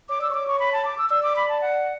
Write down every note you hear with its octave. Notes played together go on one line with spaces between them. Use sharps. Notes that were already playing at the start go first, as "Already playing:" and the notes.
C#5 D6
D5 E6
C#5 C#6 D6
C#6
B5
A5
D6
E6
D5 E6
D6
B5
A5
F#5